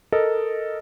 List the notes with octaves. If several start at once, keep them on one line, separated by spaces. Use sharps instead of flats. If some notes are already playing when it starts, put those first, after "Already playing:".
A4 A#4 D#5